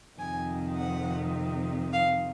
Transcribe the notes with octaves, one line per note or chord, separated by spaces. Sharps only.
F2 C3 D#3 G#5
F#5
F5